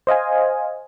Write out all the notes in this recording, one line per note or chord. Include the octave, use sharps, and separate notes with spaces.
C5 D#5 F5 G#5